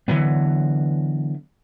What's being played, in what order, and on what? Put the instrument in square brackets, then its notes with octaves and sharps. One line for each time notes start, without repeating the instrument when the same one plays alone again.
[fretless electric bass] D3 E3 F#3 B3